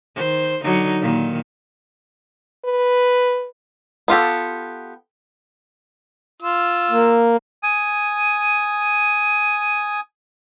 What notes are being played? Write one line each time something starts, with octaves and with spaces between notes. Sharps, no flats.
D#3 C5
D3 F#3 D#4
A#2 D#3
B4
B3 F4 G4 A4
F4 E6
A#3
G#5 D#6